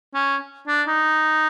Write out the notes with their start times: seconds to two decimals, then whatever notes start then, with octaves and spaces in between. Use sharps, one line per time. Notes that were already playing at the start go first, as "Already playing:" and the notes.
0.14 C#4
0.67 D4
0.88 D#4